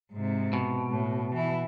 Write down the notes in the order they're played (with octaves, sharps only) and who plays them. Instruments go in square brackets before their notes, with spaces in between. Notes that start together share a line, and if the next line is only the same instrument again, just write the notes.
[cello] G#2 C3
[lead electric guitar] B2
[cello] A2
E3 E4